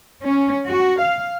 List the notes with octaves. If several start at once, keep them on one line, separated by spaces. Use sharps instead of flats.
C#4
F#4
F5